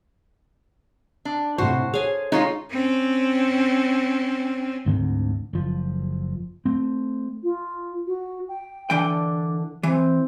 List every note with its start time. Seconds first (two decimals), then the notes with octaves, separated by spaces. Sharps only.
1.25 D4
1.58 A2 C3 F#4 C5 A5
1.94 G#4 A4 C#5 F5 G#5
2.32 G#3 C#4 D#4 F4
2.71 C4 C#4
4.86 D2 G#2 D3 C4
5.53 F#1 F3
6.65 A3 C4
7.43 F4
8.06 F#4
8.48 G5
8.90 D3 E3 D4 G5
9.83 E3 C4